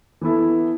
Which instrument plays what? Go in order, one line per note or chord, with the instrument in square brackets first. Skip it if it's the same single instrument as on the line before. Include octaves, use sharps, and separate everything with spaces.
[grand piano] E3 B3 E4 A4